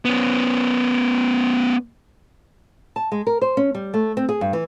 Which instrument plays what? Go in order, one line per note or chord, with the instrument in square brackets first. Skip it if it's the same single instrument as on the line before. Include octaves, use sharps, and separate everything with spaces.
[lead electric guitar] B3 C#4
[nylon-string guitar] A5
G#3
A#4
C5
C#4
G3
A3
C4
G#4
G2
E3